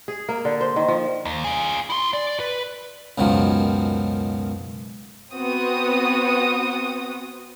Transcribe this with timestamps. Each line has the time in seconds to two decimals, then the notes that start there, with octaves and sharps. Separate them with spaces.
0.08 G#4
0.29 A#3
0.45 D3
0.61 C5
0.76 D#3
0.88 F3
1.25 D#2
1.44 F4 G#4
1.90 E4 C6
2.13 D5
2.40 B4
3.18 C#2 F#2 B2 D#3 F3
5.34 B3 C4 F#4 D#6